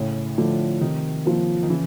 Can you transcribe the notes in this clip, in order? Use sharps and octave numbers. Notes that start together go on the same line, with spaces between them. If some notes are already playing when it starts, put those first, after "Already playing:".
Already playing: A2 C#3
D3 F3 A3
C3 D#3
F3 A#3
D#3
C#3 E3